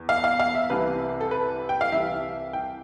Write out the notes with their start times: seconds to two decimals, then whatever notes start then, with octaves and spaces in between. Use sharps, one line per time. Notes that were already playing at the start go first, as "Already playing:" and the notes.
Already playing: E2
0.09 F5
0.24 F5
0.40 F5
0.55 E5
0.70 C2 C3 E3 B4
1.21 A4
1.31 B4
1.69 G5
1.81 F5
1.92 C2 C3 E3 E5
2.53 G5